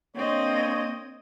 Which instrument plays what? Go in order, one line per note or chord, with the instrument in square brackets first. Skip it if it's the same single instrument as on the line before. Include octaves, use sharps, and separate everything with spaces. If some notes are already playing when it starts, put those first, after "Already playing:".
[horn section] A#3 D4 C#5 [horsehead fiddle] C4 D#5